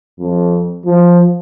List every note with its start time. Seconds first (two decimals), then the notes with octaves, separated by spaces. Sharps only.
0.20 F2
0.86 F3